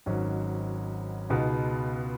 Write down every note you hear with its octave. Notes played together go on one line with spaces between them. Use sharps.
G#1 G#2 F#3 C#4
C#2 B2 B3 D#4 G#4